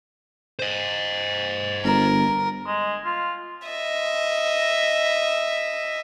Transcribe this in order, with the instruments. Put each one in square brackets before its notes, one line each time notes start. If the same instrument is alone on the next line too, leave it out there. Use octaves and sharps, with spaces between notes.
[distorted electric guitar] C5 D#5
[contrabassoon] G1 [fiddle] A#4
[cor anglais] G#3
F4
[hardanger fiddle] D#5 E5